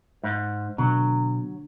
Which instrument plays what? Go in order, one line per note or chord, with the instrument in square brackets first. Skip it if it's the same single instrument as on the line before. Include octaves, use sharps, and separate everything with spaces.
[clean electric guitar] G#2
[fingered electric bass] B2 [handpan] D3 [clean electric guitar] F#3